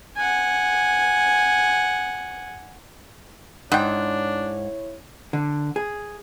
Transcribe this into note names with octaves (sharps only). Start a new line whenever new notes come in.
F#5 G#5
G#2 D4 E4 C#5 F#5 G5
D3
G#4